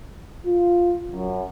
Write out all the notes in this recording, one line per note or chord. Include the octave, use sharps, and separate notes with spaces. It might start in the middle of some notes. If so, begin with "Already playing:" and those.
F4
F#2